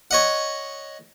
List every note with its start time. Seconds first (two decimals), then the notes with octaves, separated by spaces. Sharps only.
0.11 C#5 D#5 F#5